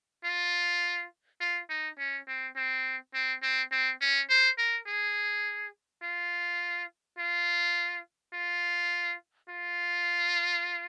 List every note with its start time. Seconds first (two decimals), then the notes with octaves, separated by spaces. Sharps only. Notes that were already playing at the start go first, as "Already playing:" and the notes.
0.24 F4
1.40 F4
1.69 D#4
1.98 C#4
2.27 C4
2.56 C4
3.14 C4
3.42 C4
3.72 C4
4.01 C#4
4.29 C5
4.58 A#4
4.87 G#4
6.03 F4
7.19 F4
8.33 F4
9.49 F4